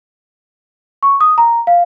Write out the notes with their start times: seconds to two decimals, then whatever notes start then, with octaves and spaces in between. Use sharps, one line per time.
1.03 C#6
1.21 D#6
1.38 A#5
1.67 F5